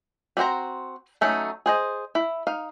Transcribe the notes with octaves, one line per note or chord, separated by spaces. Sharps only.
G3 C4 F#4 C5 A#5
F#3 A3 C#4 D#4
G#4 C5 D#5
E4
D#4 F5